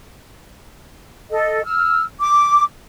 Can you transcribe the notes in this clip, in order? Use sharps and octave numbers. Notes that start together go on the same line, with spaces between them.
A4 D#5
E6 F6
D6